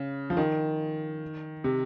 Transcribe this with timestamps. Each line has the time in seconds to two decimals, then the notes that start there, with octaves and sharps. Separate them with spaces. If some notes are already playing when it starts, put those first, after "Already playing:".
Already playing: C#3
0.30 F3
0.37 D#3
1.64 C3